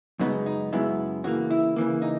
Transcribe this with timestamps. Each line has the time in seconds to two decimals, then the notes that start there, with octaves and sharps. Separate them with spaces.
0.19 F#2 C#3 G#3 B3 D#4
0.46 D#4
0.73 F#2 C#3 G#3 B3 E4
1.24 C#3 E3 A#3 F#4
1.50 E4
1.76 C#3 E3 A#3
2.02 D#4